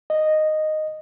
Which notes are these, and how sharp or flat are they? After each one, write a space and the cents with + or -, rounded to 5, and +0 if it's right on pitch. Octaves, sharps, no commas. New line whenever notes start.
D#5 -5